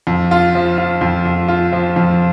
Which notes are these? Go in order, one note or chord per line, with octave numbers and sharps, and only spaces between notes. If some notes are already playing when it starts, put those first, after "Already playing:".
F2
F4
F3
F4
F2
F2
F4
F3
F2